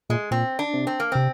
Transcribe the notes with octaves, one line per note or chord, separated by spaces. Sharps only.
A#2 G#3
A#2 C4
D4
C3
C4
A#3
C3 C4